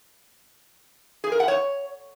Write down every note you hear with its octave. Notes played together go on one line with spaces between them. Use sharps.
G#4
A#4
F#5
C#5